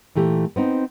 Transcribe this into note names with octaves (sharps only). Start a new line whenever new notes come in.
A#2 E3 A3 G4
B3 C4 D#4